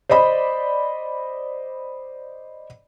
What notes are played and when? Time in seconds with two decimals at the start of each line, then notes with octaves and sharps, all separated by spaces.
0.09 C5 D5 D#5 B5